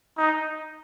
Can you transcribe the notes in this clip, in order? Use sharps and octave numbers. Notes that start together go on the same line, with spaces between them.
D#4